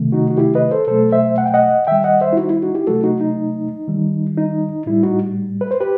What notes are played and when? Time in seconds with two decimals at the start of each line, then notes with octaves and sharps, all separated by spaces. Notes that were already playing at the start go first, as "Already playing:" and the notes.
Already playing: C3 D#3 F#3 A3
0.12 D#4 F#4
0.30 F#4
0.38 E4 G4
0.55 B4 D#5
0.71 A4 C5
0.87 B2 F#3 A3 A4 C5
1.12 C5 E5
1.38 F#5
1.45 G5
1.54 D#5 F#5
1.87 D#3 G3 E5 G5
2.04 D#5 F#5
2.21 C5 E5
2.33 E4
2.37 D#4 F#4
2.50 E4
2.63 D#4 F#4
2.75 E4 G4
2.87 C3 F#3 A3 F#4 A4
3.04 D#4 F#4
3.21 D#4
3.88 D#3 G3
4.37 D#4
4.86 A2 G3 E4
5.03 D#4 F#4
5.61 B4
5.71 C5
5.81 G4 B4